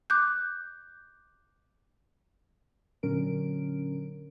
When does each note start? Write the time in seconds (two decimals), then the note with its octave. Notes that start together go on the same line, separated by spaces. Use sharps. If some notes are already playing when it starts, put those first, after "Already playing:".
0.10 D6 F#6 G6
3.03 A#2 D3 F#3 C#4 A#4 D7